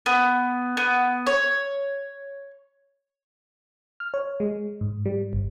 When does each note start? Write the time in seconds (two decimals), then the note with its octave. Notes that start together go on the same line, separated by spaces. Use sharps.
0.06 B3
0.77 B3
1.27 C#5
4.00 F6
4.14 C#5
4.40 G#3
4.81 G#2
5.06 G3
5.33 G1